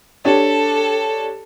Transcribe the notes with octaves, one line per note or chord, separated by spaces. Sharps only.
D4 G4 A4 C#5